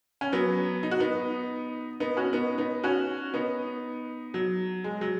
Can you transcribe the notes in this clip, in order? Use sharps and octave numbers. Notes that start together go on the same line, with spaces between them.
C#4
F#3 B3
D#4
F#4
B3 D#4
B3 D#4
C#4 F#4
B3 D#4
B3 D#4
C#4 F#4
B3 D#4
F#3
G#3
F#3